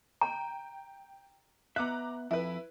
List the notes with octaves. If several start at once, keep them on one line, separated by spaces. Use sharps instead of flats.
G5 A#5
B3 E5 A#5 D6 F#6
F2 E4 B4